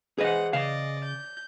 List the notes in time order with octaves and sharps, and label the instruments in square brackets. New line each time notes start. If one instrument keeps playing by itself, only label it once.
[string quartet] E3 C5 F#5 [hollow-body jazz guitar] G#4 B4 D#5
[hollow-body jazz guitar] C#3 F5 [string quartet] D5 D#5
[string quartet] G6